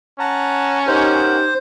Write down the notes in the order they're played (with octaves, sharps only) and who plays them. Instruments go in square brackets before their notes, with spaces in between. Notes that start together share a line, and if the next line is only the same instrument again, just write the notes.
[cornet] C#4 [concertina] F#5 A5 A#5
[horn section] D#4 G4 [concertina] A#4 F#5 [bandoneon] C5